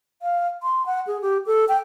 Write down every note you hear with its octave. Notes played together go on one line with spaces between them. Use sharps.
F5
C6
F#5
G#4
G4
A4
G5